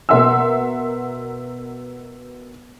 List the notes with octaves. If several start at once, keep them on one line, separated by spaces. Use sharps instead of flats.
B2 A#4 E5 F#5 C6 E6